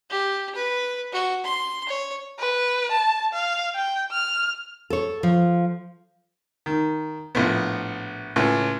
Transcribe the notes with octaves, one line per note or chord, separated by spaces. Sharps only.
G4
B4
F#4
C6
C#5
B4
A5
F5
G5
F6
A4 C#5
F3
D#3
A#1 A2 B3
C#2 A2